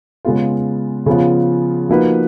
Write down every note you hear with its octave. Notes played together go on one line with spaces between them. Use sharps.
C#3 G#3 B3 F4
C#3 F3 B3 F4
F3 A#3 D#4 F#4 B4